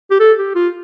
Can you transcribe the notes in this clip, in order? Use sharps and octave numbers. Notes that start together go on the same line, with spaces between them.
G4
A4
G4
F4